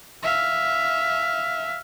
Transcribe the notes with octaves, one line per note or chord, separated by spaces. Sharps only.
E5 F5